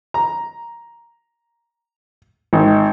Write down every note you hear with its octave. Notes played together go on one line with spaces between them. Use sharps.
A#5
G#1